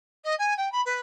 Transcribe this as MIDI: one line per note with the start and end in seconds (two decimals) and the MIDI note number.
0.24 0.35 75
0.39 0.54 80
0.57 0.71 79
0.72 0.81 83
0.85 1.00 71